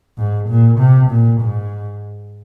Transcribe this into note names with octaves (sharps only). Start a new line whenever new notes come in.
G#2
A#2
C3
A#2
G#2